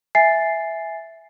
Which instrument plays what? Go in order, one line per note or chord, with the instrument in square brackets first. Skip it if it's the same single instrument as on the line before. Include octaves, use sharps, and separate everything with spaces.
[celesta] E5 G#5 A6 C7